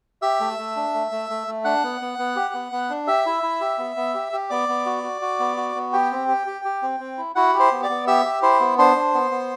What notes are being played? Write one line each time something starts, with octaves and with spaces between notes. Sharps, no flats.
G4 E5 E6
A3
A3
D4
A3
A3
A3
A3
D4 F#5 F#6
B3
B3
B3
G4
B3
B3
D4
G4 E5 E6
E4
E4
G4
B3
B3
G4
G4
B3 D5 D6
B3
F#4
F#4
F#4
B3
F#4
B3
G4 G5
C4
G4
G4
G4
C4
C4
E4
E4 F#4 F#5
G4
C5 C6
B3
D5 D6
B3
G4 E5 E6
G4
E4 C5 C6
B3
D4 C5 C6
D4
B3
B3